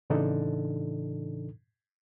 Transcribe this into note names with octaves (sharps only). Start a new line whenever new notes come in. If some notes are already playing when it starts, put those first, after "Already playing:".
A2 C#3 E3 D4 D#4 A4